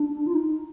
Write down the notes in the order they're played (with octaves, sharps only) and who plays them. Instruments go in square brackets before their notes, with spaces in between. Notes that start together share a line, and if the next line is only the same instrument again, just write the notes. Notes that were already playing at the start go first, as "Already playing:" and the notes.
Already playing: [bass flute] D4
F4
D#4